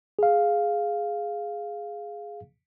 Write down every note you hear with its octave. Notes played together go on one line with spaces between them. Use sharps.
G#4 F5